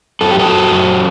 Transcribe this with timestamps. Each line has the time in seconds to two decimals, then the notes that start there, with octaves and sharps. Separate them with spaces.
0.21 F#2 A4
0.31 G4
0.39 F#4 A4
0.46 F#2
0.72 F#2